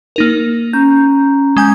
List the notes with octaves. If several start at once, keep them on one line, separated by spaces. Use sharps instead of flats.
A#3 D#4 A#4
C#4 A#5 G6
G#3 G#5 G6